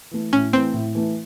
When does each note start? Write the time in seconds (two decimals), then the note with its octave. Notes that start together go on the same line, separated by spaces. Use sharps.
0.11 E3 A3
0.33 A2 C#4
0.53 E3 A3 C4
0.74 A2
0.95 E3 A3